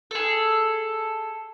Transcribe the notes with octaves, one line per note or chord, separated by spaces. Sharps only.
G#4 A4